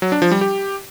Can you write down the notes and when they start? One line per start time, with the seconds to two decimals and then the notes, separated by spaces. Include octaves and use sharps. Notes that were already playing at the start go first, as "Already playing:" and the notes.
0.02 F#3
0.12 D4
0.22 F3
0.32 G3
0.41 G4